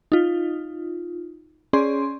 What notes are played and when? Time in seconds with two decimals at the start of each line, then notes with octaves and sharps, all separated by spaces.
0.12 D#4 F4
1.73 C#4 G#4 D5 C6